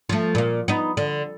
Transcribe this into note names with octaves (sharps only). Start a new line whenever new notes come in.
F3 A3
A#2 A#3
B3 D#4
D3